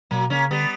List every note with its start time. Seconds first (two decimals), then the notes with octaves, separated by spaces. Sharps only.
0.11 B2 F#3 A#3
0.30 C#3 A#3 C#4
0.51 D3 G3 B3